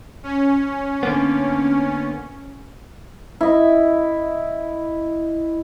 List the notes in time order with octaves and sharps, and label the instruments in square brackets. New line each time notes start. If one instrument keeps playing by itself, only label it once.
[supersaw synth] C#4
[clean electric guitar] D3 A#3 B3
[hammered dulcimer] E4 D#5